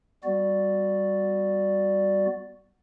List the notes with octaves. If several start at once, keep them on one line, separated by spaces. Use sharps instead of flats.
G3 B3 F#4 D5